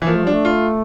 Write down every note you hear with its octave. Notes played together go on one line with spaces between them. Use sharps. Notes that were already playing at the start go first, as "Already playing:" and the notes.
E3
F3 A#3
A3
G3 D4
A3
F4